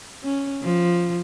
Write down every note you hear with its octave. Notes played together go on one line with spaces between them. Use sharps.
C#4
F3